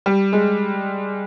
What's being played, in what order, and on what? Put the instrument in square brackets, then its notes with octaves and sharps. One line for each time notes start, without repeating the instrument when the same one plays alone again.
[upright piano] G3
G#3